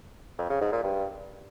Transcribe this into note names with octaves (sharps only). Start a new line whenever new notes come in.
F2
C#3
G#2
A#2
G2